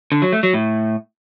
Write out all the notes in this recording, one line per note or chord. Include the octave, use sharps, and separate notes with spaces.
D3
F#3
A3
F#3
A2